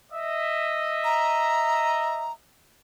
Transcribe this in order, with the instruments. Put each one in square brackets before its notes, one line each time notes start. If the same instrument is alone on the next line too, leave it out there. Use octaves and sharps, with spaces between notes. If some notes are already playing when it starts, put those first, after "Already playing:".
[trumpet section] D#5 E5
[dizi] A#5